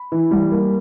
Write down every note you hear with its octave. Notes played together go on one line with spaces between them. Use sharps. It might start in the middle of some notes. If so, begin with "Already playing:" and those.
Already playing: B5
E3
G3
A#3